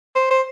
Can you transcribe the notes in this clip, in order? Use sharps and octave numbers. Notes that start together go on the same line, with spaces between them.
C5
C5